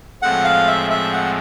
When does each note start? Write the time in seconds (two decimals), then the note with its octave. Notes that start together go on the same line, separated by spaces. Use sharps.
0.22 A2 F3 G#3 C4 F#5
0.44 F5
0.68 E5
0.91 E5
1.13 F#5